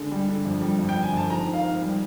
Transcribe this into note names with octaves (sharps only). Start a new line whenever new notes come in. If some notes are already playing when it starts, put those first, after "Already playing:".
Already playing: D3 G#3
G3
D3
F2
G3
F2
G5
D3
G#5
F2 A5
G#2 A#5
D#3
F5
G#2
G3